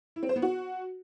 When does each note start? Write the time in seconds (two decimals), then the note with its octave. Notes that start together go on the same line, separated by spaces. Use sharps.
0.16 E4
0.23 C4
0.29 C5
0.36 B3
0.42 F#4